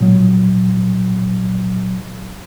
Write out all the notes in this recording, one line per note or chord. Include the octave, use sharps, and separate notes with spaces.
A#2 F#3